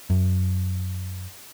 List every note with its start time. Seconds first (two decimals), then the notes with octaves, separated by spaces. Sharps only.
0.10 F#2